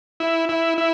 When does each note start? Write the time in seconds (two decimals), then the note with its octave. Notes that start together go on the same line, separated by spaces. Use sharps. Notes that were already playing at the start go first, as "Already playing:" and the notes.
0.20 E4
0.49 E4
0.78 E4